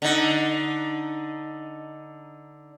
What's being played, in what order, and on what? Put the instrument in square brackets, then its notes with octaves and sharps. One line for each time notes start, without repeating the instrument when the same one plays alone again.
[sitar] D3 D#4